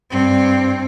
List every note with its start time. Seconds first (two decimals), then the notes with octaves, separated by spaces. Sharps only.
0.11 G2 C4